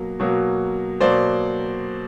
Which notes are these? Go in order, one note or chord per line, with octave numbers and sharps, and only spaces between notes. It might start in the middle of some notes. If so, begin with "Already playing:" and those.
Already playing: B2 F#3 A#3
B2 F#3 A#3
B2 F#3 A#3 C5 D5